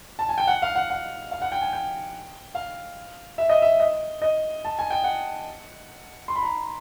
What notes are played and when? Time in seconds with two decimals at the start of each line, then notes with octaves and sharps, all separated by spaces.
0.19 A5
0.29 G#5
0.38 G5
0.47 F#5
0.62 F5
0.75 F#5
0.90 F#5
1.31 F5
1.42 F#5
1.52 G5
1.62 G#5
1.73 G5
2.55 F5
3.38 E5
3.49 D#5
3.62 E5
3.80 D#5
4.22 D#5
4.65 A5
4.79 G#5
4.90 G5
5.04 F#5
6.28 C6
6.36 B5
6.43 A#5